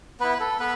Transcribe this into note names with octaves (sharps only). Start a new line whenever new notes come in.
B3 E4 B4
A4
B3 B4